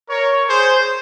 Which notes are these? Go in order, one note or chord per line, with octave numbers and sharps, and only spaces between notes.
A#4 C#5
G#4 C5